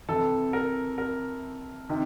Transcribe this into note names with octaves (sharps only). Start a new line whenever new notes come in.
C3 E3 A4
A#4
A#4
C3 D#3